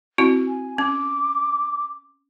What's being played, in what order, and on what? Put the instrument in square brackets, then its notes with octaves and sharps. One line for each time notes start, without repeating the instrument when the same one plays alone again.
[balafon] C4 E4 F#4
[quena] G#5
[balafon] C#4 [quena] D6